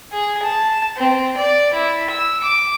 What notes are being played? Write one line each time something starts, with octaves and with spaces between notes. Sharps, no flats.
G#4
A5
C4
D5
E4
E6
D6